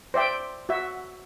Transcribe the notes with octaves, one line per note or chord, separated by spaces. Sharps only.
C5 D5 E5 G5
F#4 E5